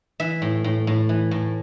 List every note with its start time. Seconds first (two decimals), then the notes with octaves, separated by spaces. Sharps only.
0.20 E3 E5
0.42 A2
0.64 A2
0.87 A2
1.09 E3
1.31 A2